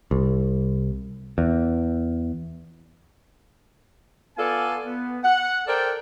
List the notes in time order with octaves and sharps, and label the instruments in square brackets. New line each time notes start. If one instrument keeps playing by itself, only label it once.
[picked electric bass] C2
E2
[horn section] B3 F4 A4 D5 G#5
B3
F#5
A4 A#4 C5 D5 G5